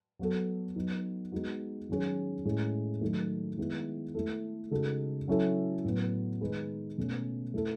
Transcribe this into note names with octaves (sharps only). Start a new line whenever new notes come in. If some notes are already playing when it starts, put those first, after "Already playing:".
F#3 B3 F#4 A4
F#3 B3 D#4
G#3 B3 D#4 F#4
D#3 F#3 C#4 G#4
A2 G#3 C#4
D#3 F#3 A3
D#3 G#3 B3 E4
A3 E4 A4
C#3 G#3 D#4 F#4 A4
F#3 C#4 E4 A4
A2 F#3 B3
D#3 G#3 D#4 G#4 B4
B2 A3 C#4
A3 E4 A4